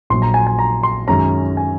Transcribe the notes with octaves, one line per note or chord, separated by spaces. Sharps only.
A#1 A#2 F#3 C6
A#5
G#5
G#5
A#5
C6
F#2 D#3 G#3 C#4 A#5
G#5